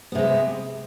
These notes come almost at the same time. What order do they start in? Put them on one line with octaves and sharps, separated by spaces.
B3 C3 G#3